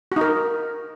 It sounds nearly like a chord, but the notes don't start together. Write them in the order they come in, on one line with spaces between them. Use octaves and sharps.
F#4 D#4 A#4